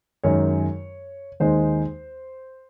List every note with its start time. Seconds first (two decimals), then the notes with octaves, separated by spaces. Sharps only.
0.23 F#2 D#3 G#3 C#5
1.40 D#2 D#3 G#3 D#4 C5